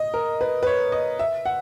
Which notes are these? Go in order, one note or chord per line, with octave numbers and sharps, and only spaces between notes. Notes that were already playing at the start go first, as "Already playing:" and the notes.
Already playing: D#5
A#4
B4
B4
C#5
D#5
E5
F#5